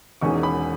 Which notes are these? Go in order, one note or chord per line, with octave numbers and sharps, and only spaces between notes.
E1 E2 D#3 G#3 C#4 C#6
B5